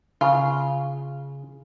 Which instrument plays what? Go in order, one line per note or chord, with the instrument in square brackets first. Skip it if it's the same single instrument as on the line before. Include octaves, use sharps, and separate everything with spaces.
[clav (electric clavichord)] C#3 [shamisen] F4